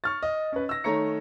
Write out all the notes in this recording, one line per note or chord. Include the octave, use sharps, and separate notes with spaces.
C#6 F6 A6
D#5
C#4 B4
E6 A#6
D#3 A3 C#5 A#5 C#7